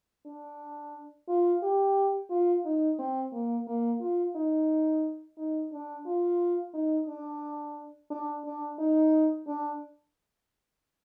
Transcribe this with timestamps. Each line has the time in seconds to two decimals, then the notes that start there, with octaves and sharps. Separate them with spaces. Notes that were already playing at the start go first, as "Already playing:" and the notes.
0.26 D4
1.28 F4
1.63 G4
2.30 F4
2.65 D#4
2.99 C4
3.33 A#3
3.67 A#3
4.01 F4
4.35 D#4
5.38 D#4
5.72 D4
6.06 F4
6.74 D#4
7.08 D4
8.11 D4
8.45 D4
8.79 D#4
9.47 D4